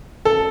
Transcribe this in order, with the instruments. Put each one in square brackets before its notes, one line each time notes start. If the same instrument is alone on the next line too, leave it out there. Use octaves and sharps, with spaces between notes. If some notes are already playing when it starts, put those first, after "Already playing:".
[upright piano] A4